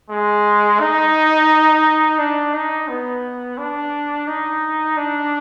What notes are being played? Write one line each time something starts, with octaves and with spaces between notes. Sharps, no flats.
G#3
D#4
D4
D#4
B3
D4
D#4
D4